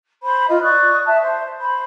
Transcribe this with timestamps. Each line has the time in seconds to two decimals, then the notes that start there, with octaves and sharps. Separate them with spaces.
0.23 C5 B5
0.47 F4 D#5
0.62 D5 C#6 D#6 F#6
1.06 E5 A5
1.20 C5
1.59 C5 B5